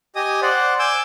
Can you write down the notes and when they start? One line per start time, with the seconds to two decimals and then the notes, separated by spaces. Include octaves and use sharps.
0.16 G4 D#5 G#5 D#6
0.42 C5 D5 F#5
0.79 G#5 D6 E6 G6